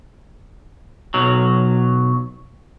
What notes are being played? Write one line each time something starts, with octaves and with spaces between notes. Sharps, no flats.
B1 F#3